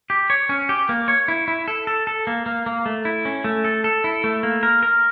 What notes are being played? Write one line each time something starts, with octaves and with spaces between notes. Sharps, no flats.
G4
C#5
C#4
G4
A#3
C#5
E4
E4
A4
A4
A4
A#3
A#3
A#3
A3
E4
C#4
A3
A4
A4
E4
A3
A#3
A#4
A#4